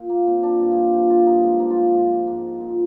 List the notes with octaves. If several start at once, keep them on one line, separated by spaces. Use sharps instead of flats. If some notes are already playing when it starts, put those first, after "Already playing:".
Already playing: A#2
A#3
A#2 C4
D4
G2 F4
G4 G#4
F3 G4
F4
G2 D#4
G#3
F3 A#3
F4
G4
G#2
G#2
A#2